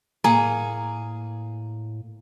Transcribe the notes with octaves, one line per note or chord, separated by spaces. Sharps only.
A2 A#3 G#4 G#5 A#5